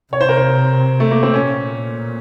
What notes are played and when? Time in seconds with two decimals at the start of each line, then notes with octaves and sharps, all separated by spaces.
0.13 C3 C#5
0.21 C5
0.29 A#4
0.37 C5
1.00 A3
1.11 A#3
1.23 C4
1.34 A#2 C#4